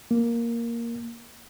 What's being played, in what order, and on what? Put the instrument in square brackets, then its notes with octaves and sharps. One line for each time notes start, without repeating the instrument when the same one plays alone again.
[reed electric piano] A#3